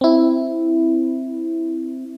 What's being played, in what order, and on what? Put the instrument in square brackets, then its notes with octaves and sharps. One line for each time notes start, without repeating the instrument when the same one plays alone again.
[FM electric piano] C4 E4